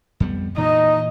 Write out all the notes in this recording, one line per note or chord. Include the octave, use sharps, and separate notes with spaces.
F2 G3 B3
A#2 E3 D#4 D#5